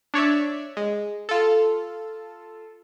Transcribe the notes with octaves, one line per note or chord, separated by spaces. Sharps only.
D4 C#5 D5 E5
G#3
F4 A4